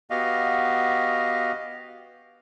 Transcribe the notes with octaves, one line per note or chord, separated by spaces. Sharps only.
B3 F#4 G4 D#5 F5